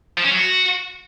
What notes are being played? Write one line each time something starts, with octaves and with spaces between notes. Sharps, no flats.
F3
C#4
F#3
F#4